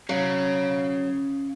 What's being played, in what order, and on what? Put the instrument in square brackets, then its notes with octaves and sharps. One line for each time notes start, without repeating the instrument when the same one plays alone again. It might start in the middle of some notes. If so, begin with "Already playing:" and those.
[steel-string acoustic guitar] F#3 [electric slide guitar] C#4 C#5 F5